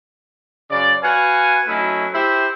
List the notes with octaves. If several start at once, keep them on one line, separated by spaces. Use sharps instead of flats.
F#2 C#3 D5
F#4 B4 F5 G#5
F#3 A3 C#4 D#4 E4
E4 G4 C5 E5